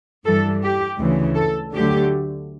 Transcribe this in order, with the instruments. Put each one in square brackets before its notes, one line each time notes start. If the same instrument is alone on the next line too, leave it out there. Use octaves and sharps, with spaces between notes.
[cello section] G2 E3 G3 A4
G4
D2 C#3 E3
A4
D2 D3 F#3 A3 G4